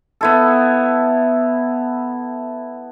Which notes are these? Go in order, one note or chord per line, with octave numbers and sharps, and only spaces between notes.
B3 E4 A4